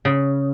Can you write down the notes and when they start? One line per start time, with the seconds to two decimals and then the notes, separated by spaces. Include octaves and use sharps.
0.05 C#3